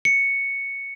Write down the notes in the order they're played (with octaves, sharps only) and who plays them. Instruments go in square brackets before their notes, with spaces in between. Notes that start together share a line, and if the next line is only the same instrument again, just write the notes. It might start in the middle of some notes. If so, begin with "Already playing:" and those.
[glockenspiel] C#7